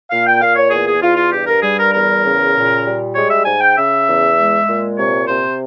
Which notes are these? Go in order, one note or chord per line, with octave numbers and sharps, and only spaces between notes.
A#2 F5
G5
A#2 F5
C#5
E2 G#4
G#4
E2 F4
F4
G2 G4
A#4
G3 G#4
A#4
E2 A#4
C#3
A#2
G3
G#3 C#5
E5
G#2 G#5
G5
C#3 E5
E2
G#3
A#2
C3 C#5
C3 C5